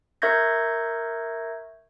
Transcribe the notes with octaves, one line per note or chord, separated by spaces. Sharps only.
A#4 E5 C#6 G6 G#6 A#6